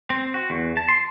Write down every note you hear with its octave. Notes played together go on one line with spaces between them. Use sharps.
C4
F#4
E2
A5
C6